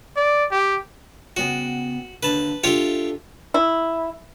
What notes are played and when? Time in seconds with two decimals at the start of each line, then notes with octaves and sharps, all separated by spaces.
0.17 D5
0.52 G4
1.37 C#3 B3 F#4 G5
2.23 D#2 D3 B4 A5
2.64 D4 F4 G4 A4 C#5 E5
3.54 E4